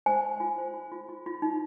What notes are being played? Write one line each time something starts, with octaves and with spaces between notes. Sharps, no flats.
C5 G#5
C5
F4
C5
F4
F4
F4
F4
D#4